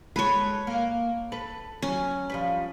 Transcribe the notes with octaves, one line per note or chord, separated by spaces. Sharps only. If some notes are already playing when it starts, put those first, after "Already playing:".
G#3 A4 B4 C#5
A#3
A4 B4
F#3 C#4
F3 G3 B4